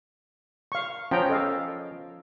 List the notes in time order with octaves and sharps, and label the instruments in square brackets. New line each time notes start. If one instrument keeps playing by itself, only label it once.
[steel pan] F5 C#6
[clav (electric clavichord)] F3 B3 [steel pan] C#4 G5 A#5
[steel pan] A4 D#5 F5